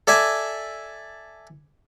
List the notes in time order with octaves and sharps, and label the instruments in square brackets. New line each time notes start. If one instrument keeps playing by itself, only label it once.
[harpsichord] A4 D5 E5 G#5 A5